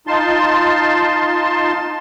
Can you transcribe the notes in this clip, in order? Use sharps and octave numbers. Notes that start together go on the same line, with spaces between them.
D#4 F4 A5 C6